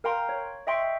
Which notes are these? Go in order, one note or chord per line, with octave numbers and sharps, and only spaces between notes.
A#4 F5 G5 A#5 C6
C#5
D#5 E5 G5 C6 C#6